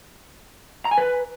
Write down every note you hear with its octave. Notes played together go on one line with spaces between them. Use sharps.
A#5
G#5
B4